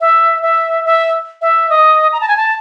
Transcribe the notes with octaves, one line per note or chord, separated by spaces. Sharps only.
E5
E5
E5
E5
D#5
A#5
A5
G#5
A5